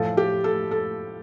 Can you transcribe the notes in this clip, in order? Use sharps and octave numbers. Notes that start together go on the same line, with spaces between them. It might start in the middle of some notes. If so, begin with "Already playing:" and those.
Already playing: A2 F3 A4
G4
A4
A4